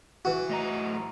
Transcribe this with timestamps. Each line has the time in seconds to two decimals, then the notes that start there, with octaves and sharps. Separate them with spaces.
0.25 E3 F#4
0.50 A2 D#5 A#5